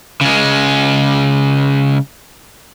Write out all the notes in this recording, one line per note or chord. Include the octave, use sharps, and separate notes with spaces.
C#3 G#3